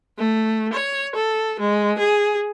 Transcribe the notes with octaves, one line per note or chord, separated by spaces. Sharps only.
A3
C#5
A4
G#3
G#4